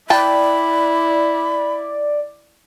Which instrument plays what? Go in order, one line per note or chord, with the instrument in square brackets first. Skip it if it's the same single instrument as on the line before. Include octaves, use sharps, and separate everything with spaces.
[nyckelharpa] E4 [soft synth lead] D5 [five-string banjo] G5 A5 [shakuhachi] B5